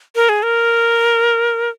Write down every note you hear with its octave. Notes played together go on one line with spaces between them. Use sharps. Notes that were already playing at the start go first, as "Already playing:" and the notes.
A#4
G#4
A#4